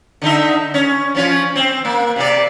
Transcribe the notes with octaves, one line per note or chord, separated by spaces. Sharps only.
D3 D#4 E5
C#4
F3 C#4 F4
C4
A#3
C3 D5